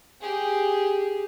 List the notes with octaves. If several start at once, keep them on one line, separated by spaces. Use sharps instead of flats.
G4 G#4